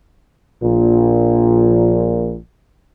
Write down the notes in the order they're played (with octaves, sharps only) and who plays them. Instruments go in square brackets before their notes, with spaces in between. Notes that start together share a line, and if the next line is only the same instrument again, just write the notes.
[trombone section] A#1 A#2